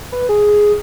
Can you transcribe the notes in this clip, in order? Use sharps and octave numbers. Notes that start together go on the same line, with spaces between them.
B4
G#4